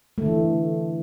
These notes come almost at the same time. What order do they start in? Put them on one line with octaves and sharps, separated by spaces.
A3 D3 E3